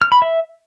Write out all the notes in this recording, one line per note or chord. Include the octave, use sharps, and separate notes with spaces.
F6
B5
E5